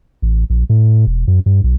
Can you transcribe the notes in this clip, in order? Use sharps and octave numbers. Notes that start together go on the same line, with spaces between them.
A1
A#1
A2
E1
F#2
G2
B1